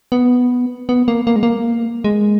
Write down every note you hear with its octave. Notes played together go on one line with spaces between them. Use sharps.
B3
B3
A#3
A#3
G#3
A#3
G#3